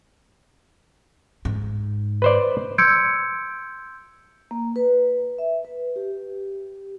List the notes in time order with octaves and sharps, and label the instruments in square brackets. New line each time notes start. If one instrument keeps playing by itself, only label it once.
[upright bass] G#2
[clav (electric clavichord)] B4 C5 D5
[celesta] C6 E6 G6 G#6 C#7 D7
[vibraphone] A#3
B4
E5
B4
G4